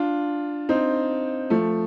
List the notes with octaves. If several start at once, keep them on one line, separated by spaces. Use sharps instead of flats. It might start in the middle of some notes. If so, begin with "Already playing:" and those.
Already playing: D4 F4
C4 D#4
F3 A3